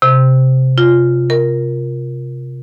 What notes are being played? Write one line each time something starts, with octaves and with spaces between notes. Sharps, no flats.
C3
F4
A#4